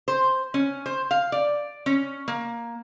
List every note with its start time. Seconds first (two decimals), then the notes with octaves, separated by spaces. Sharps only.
0.08 C5
0.54 C#4
0.86 C5
1.11 F5
1.32 D5
1.86 C#4
2.28 A#3